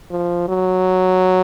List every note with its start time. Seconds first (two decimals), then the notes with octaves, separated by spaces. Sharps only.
0.11 F3
0.48 F#3